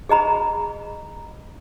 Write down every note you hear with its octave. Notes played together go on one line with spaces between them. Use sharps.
G#4 D#5 A#5 B5